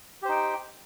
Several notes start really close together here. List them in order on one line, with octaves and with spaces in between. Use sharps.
G4 C5 D#4 G5